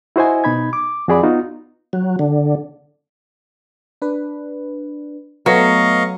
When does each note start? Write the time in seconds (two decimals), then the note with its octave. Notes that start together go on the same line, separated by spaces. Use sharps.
0.16 E4 F#4 C5 D#5 G#5
0.44 B2 D#4 B5 G#6
0.73 D6
1.08 F2 F#4 G#4 D5 B5
1.23 B3 D#4 F4 F#4
1.93 F#3
2.19 D3
4.02 D4 B4
5.46 F#3 A3 B3 D#5 F5 C#6